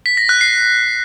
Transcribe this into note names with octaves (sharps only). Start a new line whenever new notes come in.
B6
A#6
F#6
C7